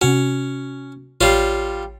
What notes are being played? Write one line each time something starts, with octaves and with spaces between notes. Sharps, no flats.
C3 C#4 F#4
A1 G3 F4 C#5 C7